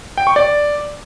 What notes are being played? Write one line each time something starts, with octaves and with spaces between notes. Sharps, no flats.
G5
C#6
D5